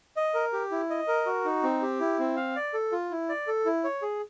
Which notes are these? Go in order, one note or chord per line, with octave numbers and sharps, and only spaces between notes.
D#5
A#4
G4
E4
D#5
A#4
F#4
D#4
C4
G4
E4
C4
F5
D5
A4
F4
E4
D5
A4
E4
C#5
G#4